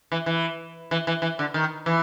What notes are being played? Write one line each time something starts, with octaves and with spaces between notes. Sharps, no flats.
E3
E3
E3
E3
E3
D3
D#3
E3